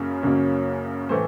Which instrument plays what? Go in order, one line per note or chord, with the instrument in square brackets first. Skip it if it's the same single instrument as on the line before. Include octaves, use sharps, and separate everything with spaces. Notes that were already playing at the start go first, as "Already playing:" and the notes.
Already playing: [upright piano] F#2 C#3 F#3 A#3 C#4
F#2 C#3 F#3 A#3 C#4
A2 E3 A3 C5